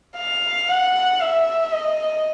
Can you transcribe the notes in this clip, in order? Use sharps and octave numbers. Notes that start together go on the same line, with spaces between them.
F5
F#5
E5
D#5